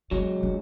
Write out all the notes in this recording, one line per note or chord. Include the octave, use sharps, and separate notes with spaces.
C#3 F#3 G#3
D3